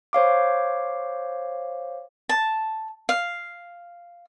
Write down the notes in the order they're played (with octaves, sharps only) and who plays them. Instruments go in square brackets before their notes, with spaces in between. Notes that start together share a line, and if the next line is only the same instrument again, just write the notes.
[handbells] C5 C#5 F5 D6
[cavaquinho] A5
F5